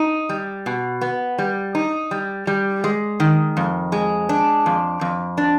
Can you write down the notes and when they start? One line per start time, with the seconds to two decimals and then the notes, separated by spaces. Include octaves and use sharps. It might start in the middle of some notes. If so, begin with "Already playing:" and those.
Already playing: D#4
0.29 G3
0.66 B2
1.01 B3
1.38 G3
1.75 D#4
2.11 G3
2.47 G3
2.84 G#3
3.20 D#3
3.57 F2
3.92 G#3
4.29 D4
4.66 F2
5.01 F2
5.38 D4